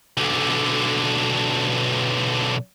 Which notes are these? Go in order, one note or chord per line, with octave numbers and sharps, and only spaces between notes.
B1 D3